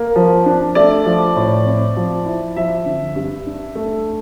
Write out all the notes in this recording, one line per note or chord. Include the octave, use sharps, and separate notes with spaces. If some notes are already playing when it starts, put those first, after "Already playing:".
Already playing: A#3
F3
D4
A3 D5
F3
A2
C4
F3
E4
F3 E5
D3
G2
D4
A3